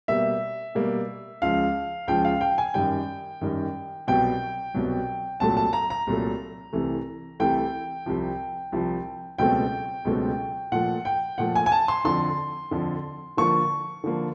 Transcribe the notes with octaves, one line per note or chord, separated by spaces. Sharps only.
B2 G3 A#3 E5
B2 G3 A#3
C#2 C#3 F3 F5
C#2 C#3 F3 G5
F5
G5
G#5
F#2 D#3 G3 G5
F#2 D#3 G3
C2 B2 F#3 G5
C2 B2 F#3
C2 A#2 F#3 A3 A5
A5
A#5
A#5
C2 A#2 F#3 A3
C2 C3 E3 A3
C2 C3 E3 A3 G5
C2 C3 F3
C2 C3 F3
C#2 B2 F#3 A3 C4 G5
C#2 B2 F#3 A3 C4
A#2 F3 A3 F#5
G5
A#2 F3 A3 F#5
G#5
G#5
A5
C6
F2 D3 F3 C6
F2 D3 F3
D3 F3 A#3 C#6
D3 F3 A#3